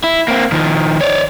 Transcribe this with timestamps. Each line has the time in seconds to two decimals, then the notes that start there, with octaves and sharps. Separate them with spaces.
0.04 E4
0.28 A#3 C4
0.52 D#3 F3
1.01 C#5 D5